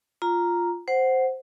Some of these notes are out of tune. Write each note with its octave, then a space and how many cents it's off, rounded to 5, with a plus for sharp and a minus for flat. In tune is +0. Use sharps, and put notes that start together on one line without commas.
F4 +0 A#5 +0
C5 +0 F#5 +5